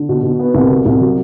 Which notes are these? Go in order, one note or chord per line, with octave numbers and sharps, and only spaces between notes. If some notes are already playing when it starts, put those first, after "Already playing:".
Already playing: D3
B2
B2
B3
C2
B2
C2
F#3